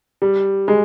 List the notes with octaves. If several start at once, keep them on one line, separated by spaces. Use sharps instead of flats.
G3
G#3